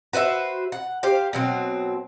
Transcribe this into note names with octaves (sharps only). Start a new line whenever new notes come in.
F#4 B4 C5 E5
F#5
G4 C5 F5
B2 F#3 C4